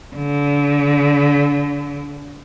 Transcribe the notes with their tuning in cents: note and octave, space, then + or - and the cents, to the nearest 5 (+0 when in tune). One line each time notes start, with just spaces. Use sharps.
D3 -35